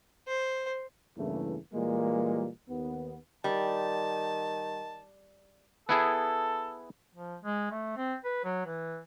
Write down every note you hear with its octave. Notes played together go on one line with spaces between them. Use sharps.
C5
E2 G2 C#3 E3 A3 A#3
A#2 E3 G3 G#3 A#3
D#2 B3
D#3 G3 A5
B3 E4 G#4 A4
F3
G#3
A3
C4
B4
F#3
E3